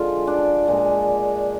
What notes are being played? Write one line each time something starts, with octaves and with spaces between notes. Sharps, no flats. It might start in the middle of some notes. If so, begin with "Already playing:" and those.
Already playing: D3 F3 G#3 F4
D4
A#2 G#3